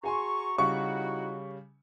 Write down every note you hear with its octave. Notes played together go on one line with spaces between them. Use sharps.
F#4 G#4 G#5 A#5 C6 C#6
C#3 G3 D#4 E4 F#4 C#6